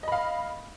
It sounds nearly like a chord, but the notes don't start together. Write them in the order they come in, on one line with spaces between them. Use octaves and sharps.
D#5 B5 F5